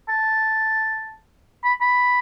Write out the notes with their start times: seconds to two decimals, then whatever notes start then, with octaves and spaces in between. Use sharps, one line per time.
0.09 A5
1.64 B5
1.81 B5